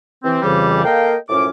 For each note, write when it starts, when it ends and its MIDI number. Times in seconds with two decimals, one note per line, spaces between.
0.24 0.38 48
0.24 0.38 52
0.24 0.38 60
0.42 0.85 41
0.42 0.85 49
0.42 0.85 52
0.42 0.85 55
0.85 1.15 58
0.85 1.15 69
0.85 1.15 70
0.85 1.15 75
0.85 1.15 77
0.85 1.15 79
1.29 1.49 42
1.29 1.49 45
1.29 1.49 53
1.29 1.49 61
1.29 1.49 86